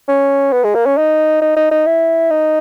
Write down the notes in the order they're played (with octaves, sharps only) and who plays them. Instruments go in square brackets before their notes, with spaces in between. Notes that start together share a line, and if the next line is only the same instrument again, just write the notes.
[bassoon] C#4
B3
G#3
A#3
C#4
D#4
D#4
D#4
D#4
E4
D#4